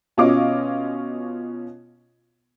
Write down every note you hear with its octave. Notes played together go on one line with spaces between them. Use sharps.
B2 C#4 F4 D#5 F5 D6